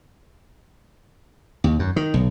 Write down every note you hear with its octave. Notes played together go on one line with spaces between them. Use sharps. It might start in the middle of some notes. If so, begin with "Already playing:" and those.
D#2
F#2
D#3
B1